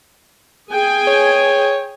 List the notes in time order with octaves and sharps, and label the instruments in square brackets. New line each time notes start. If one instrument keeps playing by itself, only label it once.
[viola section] G#4 G5 G#5
[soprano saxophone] C#5